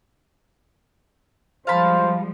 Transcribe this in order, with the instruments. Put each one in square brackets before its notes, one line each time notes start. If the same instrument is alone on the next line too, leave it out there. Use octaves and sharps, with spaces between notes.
[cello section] F3 G3 G#3 [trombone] C5 [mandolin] F5 A5 B5